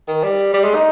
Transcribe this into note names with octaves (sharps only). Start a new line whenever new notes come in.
D#3
G3
G3
G#3
D#4